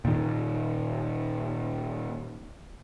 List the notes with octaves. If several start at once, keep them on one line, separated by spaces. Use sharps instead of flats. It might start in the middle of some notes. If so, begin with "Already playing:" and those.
A#2 D#3